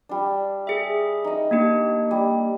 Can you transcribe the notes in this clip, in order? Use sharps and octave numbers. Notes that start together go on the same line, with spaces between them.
G3 D4
G#4 E5
D#4 D#5
A#3 D4 G4
G3